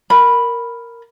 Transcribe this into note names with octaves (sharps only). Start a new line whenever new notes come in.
A#4 B5